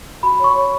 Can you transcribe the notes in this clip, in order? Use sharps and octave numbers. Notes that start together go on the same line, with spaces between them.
F#4 B5
C#5 C#6
C#5